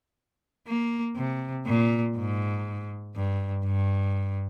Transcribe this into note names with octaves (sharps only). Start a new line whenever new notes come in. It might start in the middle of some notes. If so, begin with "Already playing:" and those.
A#3
C3
A#2
G#2
G2
G2